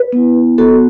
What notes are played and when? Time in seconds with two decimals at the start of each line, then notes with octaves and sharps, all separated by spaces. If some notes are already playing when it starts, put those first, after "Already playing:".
Already playing: B4
0.13 B3 E4
0.58 B3 F#4 A4